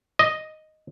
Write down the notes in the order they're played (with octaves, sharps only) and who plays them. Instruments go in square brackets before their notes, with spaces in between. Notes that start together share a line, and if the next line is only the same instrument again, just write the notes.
[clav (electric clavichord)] D#5